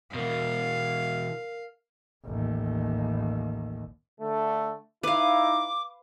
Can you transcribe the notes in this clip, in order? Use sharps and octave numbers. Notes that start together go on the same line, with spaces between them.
B2 E3 A#4 F5
A1 D#2
D3 A3
D#4 E4 B4 F5 D6